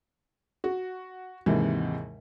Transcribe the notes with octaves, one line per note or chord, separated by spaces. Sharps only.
F#4
D#2 G#2 C3 E3